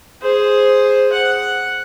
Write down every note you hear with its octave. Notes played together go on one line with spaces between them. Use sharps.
G#4 C5
F#5